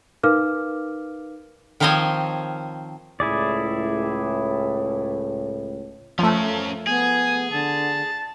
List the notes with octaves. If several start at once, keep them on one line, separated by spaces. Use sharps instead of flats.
D#4 A#4 B4 F5 D6 F6
D#3 F3 C4 C5 C#5 D#5
C#2 A2 E4 G#4 D5
F3 A3 C#4 A#4
B3 G#4 G#5
D3 A5